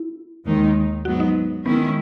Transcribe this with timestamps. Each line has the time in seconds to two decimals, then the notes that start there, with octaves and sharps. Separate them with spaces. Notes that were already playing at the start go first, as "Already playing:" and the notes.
Already playing: E4
0.44 D#2 D#3 G#3 D#4
1.05 G#2 F#3 B3 F#4
1.20 D#4
1.65 D#3 G#3 B3 C#4 E4